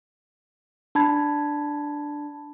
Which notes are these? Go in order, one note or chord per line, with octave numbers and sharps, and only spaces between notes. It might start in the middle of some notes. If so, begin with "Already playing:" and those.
D4 A5 B5 G#6